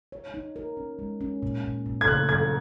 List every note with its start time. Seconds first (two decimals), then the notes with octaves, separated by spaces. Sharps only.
0.12 C#5
0.34 D#4
0.56 A#4
0.77 C#4
0.99 G#3
1.21 C#4
1.43 A#2
1.64 A#2
1.86 A#2
2.01 G#6
2.08 C#3 F#6
2.29 F#3 G#6